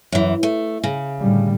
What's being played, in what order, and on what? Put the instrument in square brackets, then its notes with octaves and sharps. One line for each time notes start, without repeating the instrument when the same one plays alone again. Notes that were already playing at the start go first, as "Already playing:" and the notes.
[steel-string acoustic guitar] F#2 E3
A3
C#3
[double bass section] A2 D3 G3